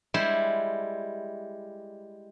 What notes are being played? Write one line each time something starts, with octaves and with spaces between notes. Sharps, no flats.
G3 G#3 E4 C5